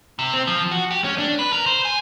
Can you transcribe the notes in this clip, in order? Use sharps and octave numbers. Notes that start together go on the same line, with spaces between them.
C3
C4
F3
F#4
G4
C#4
D4
B4
A#4
C5
G#5